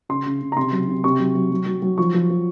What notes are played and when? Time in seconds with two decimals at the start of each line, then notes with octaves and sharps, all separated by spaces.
0.09 C#3 C6
0.26 C#3
0.42 C#3
0.52 A#5
0.56 C3 C6
0.72 F#3
0.88 C3
1.04 C3 C#6
1.19 F#3
1.35 F#3
1.51 F#3
1.66 F#3
1.82 F#3
1.98 F3 C#6
2.14 F3
2.30 F3